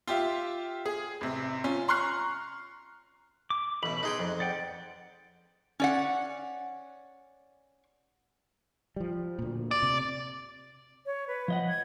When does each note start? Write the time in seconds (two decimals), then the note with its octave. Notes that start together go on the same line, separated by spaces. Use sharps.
0.07 F4 G4 E5 F5
0.86 G#4
1.21 A1 C3
1.64 C#4 F4
1.88 A#5 C6 C#6 F6 F#6 C7
3.50 D6
3.83 A1 B2 B5
4.03 D#4 G#4 B4 G5 C6
4.19 F2
4.40 D5 F#5 G5
5.80 C#4 D5 F#5
8.96 F3 G3
9.39 D2 A#2
9.71 D5
9.83 C3
11.06 C#5
11.28 B4
11.48 F3 D#5 F#5
11.68 G#6